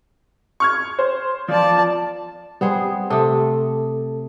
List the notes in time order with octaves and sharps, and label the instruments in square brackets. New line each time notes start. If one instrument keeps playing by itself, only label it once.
[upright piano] C#6 F6 G#6
C5
[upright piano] F3 [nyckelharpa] D5 A5
[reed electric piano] G3 [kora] B3 C4 G#4
[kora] C3 A3 [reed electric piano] A4 A5 D#6